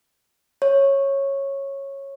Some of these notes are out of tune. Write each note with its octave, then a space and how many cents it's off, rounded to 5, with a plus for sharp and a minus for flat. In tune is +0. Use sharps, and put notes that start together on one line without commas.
C#5 -10